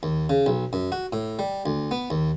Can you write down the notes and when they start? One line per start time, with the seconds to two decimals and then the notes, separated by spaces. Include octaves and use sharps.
0.03 D#2
0.29 C#3
0.46 B1
0.73 F#2
0.92 F#4
1.13 A2
1.39 G3
1.66 D2
1.91 B3
2.10 D#2